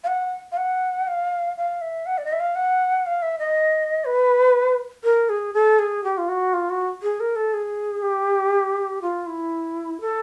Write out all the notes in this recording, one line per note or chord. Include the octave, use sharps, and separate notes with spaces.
F5
F#5
F5
F#5
F5
F5
E5
F#5
D5
D#5
E5
F5
F#5
F5
E5
D#5
B4
A#4
G#4
A4
G#4
G4
F4
F#4
F4
F#4
G#4
A#4
A4
G#4
G4
F4
E4
A4